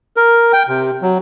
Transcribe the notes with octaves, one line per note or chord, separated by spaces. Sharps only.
A#4
G5
C3
F#3